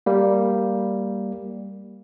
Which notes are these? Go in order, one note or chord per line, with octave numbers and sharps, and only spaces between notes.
G3 A#3